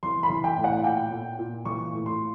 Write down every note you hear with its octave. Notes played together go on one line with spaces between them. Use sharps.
E3 C6
B5
E3
G5
A2
F#5
A#2 G5
A#2
A#2
E3 C#6
A2
C6